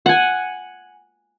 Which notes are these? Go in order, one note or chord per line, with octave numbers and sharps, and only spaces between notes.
F#5 G#5